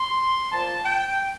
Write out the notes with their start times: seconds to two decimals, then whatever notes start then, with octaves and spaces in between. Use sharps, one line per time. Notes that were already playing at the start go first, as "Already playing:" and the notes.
Already playing: C6
0.51 A#2 F3 A#3 A5
0.85 G5